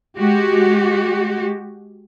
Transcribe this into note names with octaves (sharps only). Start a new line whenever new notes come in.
G#3 F#4 G4